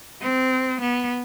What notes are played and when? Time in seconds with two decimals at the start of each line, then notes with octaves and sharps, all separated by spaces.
0.22 C4
0.81 B3